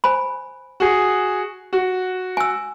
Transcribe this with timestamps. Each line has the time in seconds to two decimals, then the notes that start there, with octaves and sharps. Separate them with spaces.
0.04 C5 G#5 B5
0.80 F#4 G#4
1.73 F#4
2.37 G#5 E6